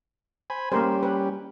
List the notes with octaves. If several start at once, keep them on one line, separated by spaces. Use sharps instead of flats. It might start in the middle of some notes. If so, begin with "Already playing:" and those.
C5 G#5 B5
G3 A#3 C#4 G4 A#4 C5
B4